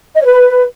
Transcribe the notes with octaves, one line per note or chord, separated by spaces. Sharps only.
D#5
C#5
B4